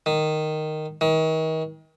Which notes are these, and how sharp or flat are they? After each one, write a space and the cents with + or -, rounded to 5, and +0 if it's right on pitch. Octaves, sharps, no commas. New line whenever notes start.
D#3 -10
D#3 +35